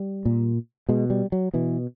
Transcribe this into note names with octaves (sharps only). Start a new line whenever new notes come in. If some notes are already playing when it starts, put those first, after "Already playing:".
Already playing: G3
A#2
B2 G#3
G3
F#3
B2 E3